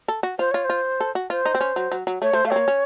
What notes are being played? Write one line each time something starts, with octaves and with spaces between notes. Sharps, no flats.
A4
F#4
F4 C5
F4 C#5
C5
F4
A4
F#4
F4 C5
D#4
C4
C#4
F#3
F#3
F#3
A3 C#5
A3 C5
A3 F5
C4 C#5
A#3
C#4